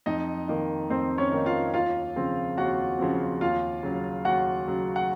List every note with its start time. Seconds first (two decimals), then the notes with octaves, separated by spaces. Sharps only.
0.06 F2 D#4 D#5
0.48 D#3 A#3 D#4
0.90 F2 C4 C5
1.18 C#4 C#5
1.32 D#3 A#3 D#4
1.46 F4 F5
1.74 D#2 F4 F5
2.16 C#3 F3 C4
2.57 D#2 F#4 F#5
2.99 C#3 F3 C4
3.41 D#2 F4 F5
3.83 C#3 F#3
4.25 D#2 F#4 F#5
4.67 C#3 F#3
4.96 F#5